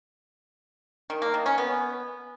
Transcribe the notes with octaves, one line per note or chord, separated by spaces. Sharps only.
D#3
A#3
D#3
C#4
B3